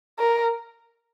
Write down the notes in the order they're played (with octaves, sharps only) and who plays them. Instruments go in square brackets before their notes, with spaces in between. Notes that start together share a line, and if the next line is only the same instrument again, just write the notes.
[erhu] A#4